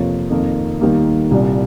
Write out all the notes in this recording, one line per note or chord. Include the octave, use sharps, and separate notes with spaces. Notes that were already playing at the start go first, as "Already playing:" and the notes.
Already playing: F2 C3 F3 A#3 C#5
F2 D#3 A#3
D#2 D#3 G3 A#3
C2 A#2 G3